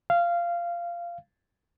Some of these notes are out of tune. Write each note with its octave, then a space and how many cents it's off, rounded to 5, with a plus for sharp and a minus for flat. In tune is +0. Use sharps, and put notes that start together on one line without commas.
F5 -15